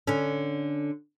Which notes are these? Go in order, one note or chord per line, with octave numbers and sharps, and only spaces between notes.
D3 C#4